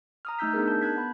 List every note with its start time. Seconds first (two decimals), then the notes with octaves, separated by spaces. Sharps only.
0.25 A#5 D#6 F6
0.39 A3 D#4 E6 G6 B6
0.53 B3 D4 D#4 G#4 A#4
0.68 A5 G6
0.82 A5 F#6 G#6 B6
0.96 B3 B5